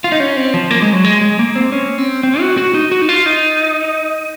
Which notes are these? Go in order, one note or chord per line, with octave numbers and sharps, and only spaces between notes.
F4
D#4
C#4
C4
F3
A#3
G#3
F#3
G#3
G#3
A#3
C4
C#4
C4
C4
F#4
F#4
D#4
F#4
D#4
F4
D#4